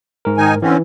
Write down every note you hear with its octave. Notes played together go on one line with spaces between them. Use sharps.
G#2 A#4
D#3 D#4 G#5
D3 E3 C4 C#4